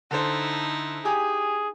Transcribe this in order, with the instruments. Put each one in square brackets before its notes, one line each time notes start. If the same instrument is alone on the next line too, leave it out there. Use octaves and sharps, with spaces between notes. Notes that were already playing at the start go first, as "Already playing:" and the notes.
[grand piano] D3 A4 C5 [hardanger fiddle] D#4 E4
[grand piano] G4 G#5 [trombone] G#4